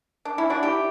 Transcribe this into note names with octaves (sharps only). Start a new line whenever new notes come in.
D4
C#4 E4
D4 F#4
E4 G4